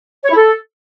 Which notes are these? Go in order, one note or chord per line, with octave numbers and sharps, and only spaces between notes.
C#5
E4
A4